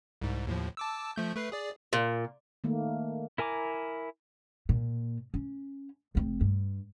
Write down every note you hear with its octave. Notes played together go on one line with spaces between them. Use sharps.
C2 G#2
D#2 A2 F3
A5 D6 E6
F3 A3 G6
A3 B4 C7
G#4 D5
A#2
D#3 A3 A#3
E4 A#4 G#5 A#5 D6
A#2
C#4
F1 C4
G2